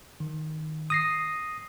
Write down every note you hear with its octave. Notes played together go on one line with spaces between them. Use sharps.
D#3
D#6 A#6 C7